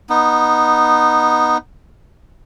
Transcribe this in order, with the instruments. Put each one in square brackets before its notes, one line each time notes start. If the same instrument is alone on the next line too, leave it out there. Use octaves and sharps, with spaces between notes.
[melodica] B3 D#4